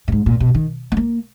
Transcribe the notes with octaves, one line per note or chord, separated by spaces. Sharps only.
A#2
G#2
A#2
B2
D#3
B3
A#3